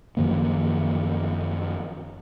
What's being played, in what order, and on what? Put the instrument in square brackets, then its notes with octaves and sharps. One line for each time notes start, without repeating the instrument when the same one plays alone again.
[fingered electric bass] F#2 D#3 F3 A#3